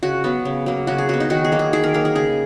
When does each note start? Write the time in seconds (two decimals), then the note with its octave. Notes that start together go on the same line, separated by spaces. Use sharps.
0.03 C#3 F#4
0.24 F#3 B3
0.45 C#3
0.66 F#3 A#3
0.87 C#3 F#4
0.98 G#4
1.09 F#3 B3 F#4
1.20 D#4
1.30 D#3 F#4
1.44 G#4
1.52 F#3 A#3
1.59 G#4
1.73 D#3 G#4
1.84 A#4
1.94 F#3 A#3 A#4
2.05 G#4
2.15 C#3 G#4